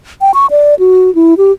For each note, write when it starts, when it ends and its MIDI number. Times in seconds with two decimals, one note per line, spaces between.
0.21 0.31 79
0.34 0.46 85
0.51 0.75 74
0.79 1.13 66
1.15 1.34 64
1.38 1.52 67